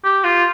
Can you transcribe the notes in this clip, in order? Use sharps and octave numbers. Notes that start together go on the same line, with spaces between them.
G4
F4